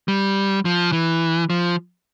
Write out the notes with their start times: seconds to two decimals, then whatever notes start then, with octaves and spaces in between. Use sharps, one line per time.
0.08 G3
0.65 F3
0.92 E3
1.50 F3